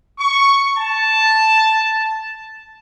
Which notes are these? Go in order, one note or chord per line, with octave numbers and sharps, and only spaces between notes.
C#6
A5